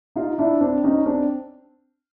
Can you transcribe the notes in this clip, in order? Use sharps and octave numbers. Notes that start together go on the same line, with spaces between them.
D#4 F4
D4 E4
C4 D4
C#4 D#4
C4 D4